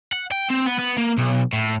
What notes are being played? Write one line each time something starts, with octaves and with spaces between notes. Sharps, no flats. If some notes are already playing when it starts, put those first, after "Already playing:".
F#5
G5
C4
B3
B3
A#3
B1
A2